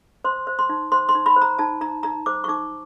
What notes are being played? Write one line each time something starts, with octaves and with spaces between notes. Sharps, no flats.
C5 C6
C5
C6
D#4
C5 C6
C6
D#4
B5
C5
A#5
D#4 A5
D#4 A#5
D#4 A#5
C5 D6
C#6
D#4 D6